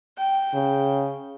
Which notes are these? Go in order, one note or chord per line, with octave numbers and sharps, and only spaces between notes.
G5
C#3